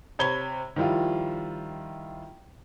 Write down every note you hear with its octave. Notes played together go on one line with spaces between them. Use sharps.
C3 C#5 B5 G#6 G7
D#3 F3 G3 E4 F4